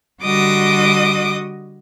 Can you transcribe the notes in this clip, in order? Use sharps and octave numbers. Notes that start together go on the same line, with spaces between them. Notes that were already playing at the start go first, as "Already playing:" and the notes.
D3 G3 F#4 D#5 D6 D#6